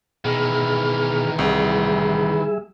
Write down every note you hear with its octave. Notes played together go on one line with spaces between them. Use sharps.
B2 D#3 E3 G#4 F6
C2 G3 G#4 E5